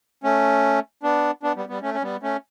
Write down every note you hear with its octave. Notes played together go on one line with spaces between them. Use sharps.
A3 C#4
B3 D4
B3 D4
G3 B3
G3 B3
A3 C#4
C#4
G3 B3
A3 C#4